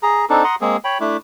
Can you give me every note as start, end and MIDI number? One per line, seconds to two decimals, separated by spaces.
0.03 0.25 68
0.03 0.25 82
0.30 0.44 60
0.30 0.44 62
0.30 0.44 63
0.30 0.44 69
0.44 0.55 78
0.44 0.55 82
0.44 0.55 84
0.44 0.55 87
0.61 0.77 56
0.61 0.77 58
0.61 0.77 60
0.61 0.77 68
0.84 0.98 73
0.84 0.98 79
0.84 0.98 83
1.00 1.17 57
1.00 1.17 62
1.00 1.17 64